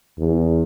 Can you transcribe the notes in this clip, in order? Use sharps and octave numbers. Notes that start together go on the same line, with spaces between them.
E2